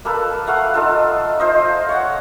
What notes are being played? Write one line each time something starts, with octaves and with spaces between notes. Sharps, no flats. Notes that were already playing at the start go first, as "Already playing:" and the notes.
A#3 A4 B4
A3 F5 F#5
D#4 F4 A4
F4 C5 D#5
C#5 F#5